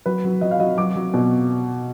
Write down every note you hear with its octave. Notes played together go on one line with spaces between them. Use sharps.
F#3 B4
F#3
F#3 D#5
F5
F#3 D#5
F#3 D6
F#3
B2